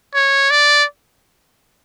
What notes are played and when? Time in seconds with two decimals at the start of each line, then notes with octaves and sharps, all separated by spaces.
0.14 C#5
0.51 D5